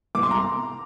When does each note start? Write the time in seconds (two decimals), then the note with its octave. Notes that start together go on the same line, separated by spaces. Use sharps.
0.15 C2 D6
0.23 C6
0.31 A#5